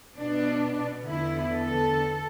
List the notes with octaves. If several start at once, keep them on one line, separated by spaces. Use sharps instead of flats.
B2 B3 D4
E2 D3 B3 E4
A4